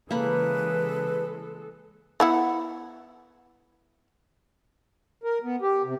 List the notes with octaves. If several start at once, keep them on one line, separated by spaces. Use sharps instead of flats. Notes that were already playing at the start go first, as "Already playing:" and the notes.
C#3 E3 G#3 A#3 A4 B4 B5
B3 E4 F#5
A#4
B3
G4
C3